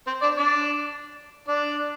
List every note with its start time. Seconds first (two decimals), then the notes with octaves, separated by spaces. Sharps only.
0.07 C4 C5
0.22 D4 D5
0.38 D4 D5
1.48 D4 D5